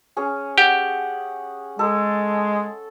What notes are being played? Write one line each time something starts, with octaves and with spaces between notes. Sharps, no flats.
C#4 G#4
G4 F#5
G#3 A4